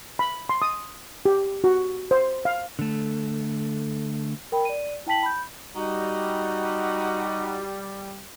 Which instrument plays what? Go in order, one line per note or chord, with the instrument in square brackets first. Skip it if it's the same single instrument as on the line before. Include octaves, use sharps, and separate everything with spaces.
[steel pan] B5
C6
D#6
G4
F#4
C5
F5
[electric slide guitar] D3 A3
[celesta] A#4 G5 B5
D5 D#7
E4 G5 A5 B6 F#7
B5 G6
[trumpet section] G3 [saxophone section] D#4 F#4